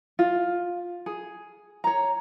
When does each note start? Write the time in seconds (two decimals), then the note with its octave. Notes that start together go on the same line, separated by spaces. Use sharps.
0.19 F4
1.06 G#4
1.84 C#5 A#5